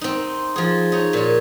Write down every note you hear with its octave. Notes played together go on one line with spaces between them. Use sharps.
C4 D#4
F3 G#4
D#4 C#5
A#2 C#5